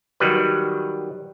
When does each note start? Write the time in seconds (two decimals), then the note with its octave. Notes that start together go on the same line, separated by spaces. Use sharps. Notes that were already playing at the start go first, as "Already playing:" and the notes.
0.20 D#3 F#3 G3 B4